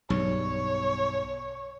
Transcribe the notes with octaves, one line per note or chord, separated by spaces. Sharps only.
B1 G2 C#5